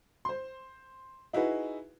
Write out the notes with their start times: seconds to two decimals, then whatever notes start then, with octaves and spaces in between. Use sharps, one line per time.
0.25 C5 C6
1.33 D#4 E4 F#4 G#4 B4